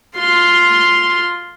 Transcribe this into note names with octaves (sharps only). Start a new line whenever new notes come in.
F4 C6